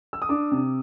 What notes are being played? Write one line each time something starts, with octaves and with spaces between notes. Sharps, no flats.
E6
D#6
D4 D6
C3